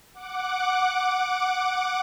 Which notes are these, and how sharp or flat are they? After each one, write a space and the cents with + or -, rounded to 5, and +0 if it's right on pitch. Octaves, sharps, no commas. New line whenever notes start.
F#5 +0 D6 +0